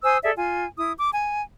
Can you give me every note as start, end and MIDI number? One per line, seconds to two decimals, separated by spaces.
0.03 0.18 72
0.03 0.18 80
0.03 0.18 87
0.03 0.18 88
0.23 0.31 68
0.23 0.31 69
0.23 0.31 74
0.23 0.31 76
0.36 0.65 65
0.36 0.65 80
0.77 0.91 64
0.77 0.91 87
0.99 1.10 86
1.13 1.42 80